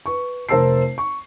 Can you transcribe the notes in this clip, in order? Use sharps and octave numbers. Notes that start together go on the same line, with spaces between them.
B4 C#6
F1 A#4 C5 A5 E6 C7
C#6